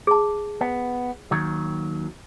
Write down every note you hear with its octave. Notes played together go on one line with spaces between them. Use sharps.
G#4 A5
B3
D#2 D#3 F#3